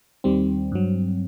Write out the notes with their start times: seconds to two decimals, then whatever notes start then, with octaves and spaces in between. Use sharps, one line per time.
0.24 D#2 D#3 G3 C4
0.72 G2 F#3